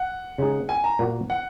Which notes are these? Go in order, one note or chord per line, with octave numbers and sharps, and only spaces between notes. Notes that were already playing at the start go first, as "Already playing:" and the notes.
Already playing: F#5
C#3 G#3 D#4 G#4
G#5
A#5
A#2 A#3 F#4
F#5